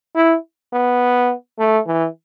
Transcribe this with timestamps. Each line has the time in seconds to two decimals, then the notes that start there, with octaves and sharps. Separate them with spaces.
0.16 E4
0.73 B3
1.59 A3
1.86 E3